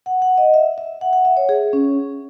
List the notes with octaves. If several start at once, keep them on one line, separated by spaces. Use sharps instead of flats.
F#5
F#5
D#5
E5
E5
F#5
F#5
E5
C#5
G#4
C#4